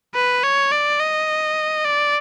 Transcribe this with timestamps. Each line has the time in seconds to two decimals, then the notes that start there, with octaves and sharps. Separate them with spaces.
0.14 B4
0.43 C#5
0.72 D5
1.00 D#5
1.85 D5